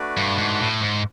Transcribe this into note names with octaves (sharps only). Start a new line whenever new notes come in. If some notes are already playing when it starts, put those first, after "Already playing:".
Already playing: A3 D4 F#4 B4 D5
G2
G#2
A2
G#2